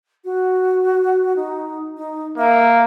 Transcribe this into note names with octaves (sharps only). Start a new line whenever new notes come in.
F#4
D#4
D#4
A#3 E5